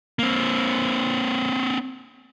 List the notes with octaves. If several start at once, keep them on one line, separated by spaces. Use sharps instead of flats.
A#3 C4